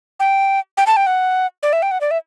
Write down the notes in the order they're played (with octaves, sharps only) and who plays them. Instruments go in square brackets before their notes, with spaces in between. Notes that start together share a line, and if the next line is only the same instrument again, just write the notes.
[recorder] G5
G5
A5
G5
F#5
D5
E5
G5
F#5
D5
E5